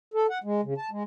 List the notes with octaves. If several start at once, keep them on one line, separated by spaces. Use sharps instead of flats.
A4
F#5
G#3
C#3
A5
G#3